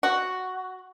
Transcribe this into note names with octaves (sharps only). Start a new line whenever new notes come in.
F#4